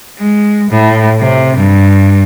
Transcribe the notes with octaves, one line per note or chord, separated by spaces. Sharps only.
G#3
A2
C3
G2